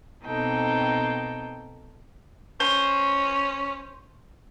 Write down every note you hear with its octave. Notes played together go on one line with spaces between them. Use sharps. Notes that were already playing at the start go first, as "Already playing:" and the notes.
B2 A#3 C4 D#4 A4 G5
C#4 C5